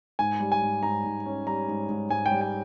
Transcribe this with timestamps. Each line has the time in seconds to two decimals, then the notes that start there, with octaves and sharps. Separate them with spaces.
0.19 G#2 G#5
0.40 G3
0.52 G#5
0.62 G#2
0.83 G#2 A#5
1.04 G#2
1.26 C#4
1.46 G3 A#5
1.68 G#2
1.89 G#2
2.10 G#2 G#5
2.26 G5
2.31 G3
2.41 G5